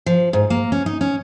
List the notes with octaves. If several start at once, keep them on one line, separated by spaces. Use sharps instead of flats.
F3
G#2
A#3
C#4
D#4
C#4